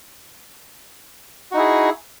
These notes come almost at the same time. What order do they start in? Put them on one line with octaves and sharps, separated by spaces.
F#4 D#4 E4 G#4